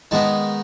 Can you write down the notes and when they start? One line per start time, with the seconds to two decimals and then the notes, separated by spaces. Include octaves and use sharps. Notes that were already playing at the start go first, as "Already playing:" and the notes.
0.11 D#3 G#3 B3 D#4 A5